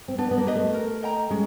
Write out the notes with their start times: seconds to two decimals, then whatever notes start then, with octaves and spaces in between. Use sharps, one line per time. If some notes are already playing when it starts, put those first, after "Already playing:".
0.08 C4
0.18 B3 D4
0.31 B3
0.38 A#3
0.47 G4 B4 D#5
0.55 A3
0.74 A#4
1.03 D#5 G5 A#5
1.31 G#3 C#4